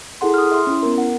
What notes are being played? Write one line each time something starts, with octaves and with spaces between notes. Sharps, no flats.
E4 G#4 A4 F#5 C6
D#6 F6
E5 C6
C#4 E4
B3 A#4
F#5